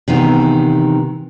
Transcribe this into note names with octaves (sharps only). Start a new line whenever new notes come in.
C3 D#3 E3 B3